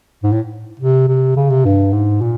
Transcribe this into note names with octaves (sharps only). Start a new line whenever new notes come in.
G#2
A2
C3
C3
C#3
C3
G2
G#2
A#2